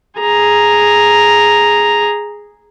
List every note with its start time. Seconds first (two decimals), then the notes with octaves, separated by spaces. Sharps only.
0.20 G#4 A#5